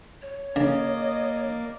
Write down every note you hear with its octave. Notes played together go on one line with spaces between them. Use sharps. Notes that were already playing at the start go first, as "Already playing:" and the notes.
C#5
C#3 A#3 D5 D#5